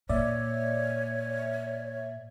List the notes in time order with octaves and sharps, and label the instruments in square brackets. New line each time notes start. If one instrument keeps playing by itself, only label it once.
[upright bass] A#2 [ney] C#5 [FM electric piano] D5 E5